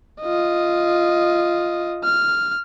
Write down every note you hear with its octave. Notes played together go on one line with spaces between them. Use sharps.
F4 D#5
F6